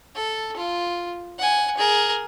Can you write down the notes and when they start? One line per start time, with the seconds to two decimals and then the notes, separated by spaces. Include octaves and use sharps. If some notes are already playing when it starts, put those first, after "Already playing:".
0.15 A4
0.56 F4
1.38 F#5 G#5
1.77 G#4 A#4